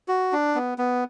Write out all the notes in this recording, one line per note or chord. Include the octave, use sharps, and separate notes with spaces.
F#4
D4
B3
B3